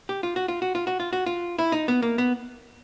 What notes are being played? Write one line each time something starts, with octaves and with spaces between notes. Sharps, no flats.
G4
F4
F#4
F4
F#4
F4
F#4
F4
F#4
F4
E4
D#4
B3
A#3
B3